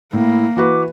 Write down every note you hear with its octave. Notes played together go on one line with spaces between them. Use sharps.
A2 A#3 E4
E3 F#4 B4 D6